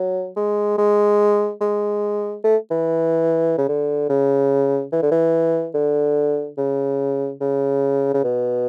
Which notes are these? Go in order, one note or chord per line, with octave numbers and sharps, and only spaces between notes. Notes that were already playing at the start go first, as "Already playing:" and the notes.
Already playing: F#3
G#3
G#3
G#3
A3
E3
C#3
D3
C#3
E3
D3
E3
D3
C#3
C#3
C#3
B2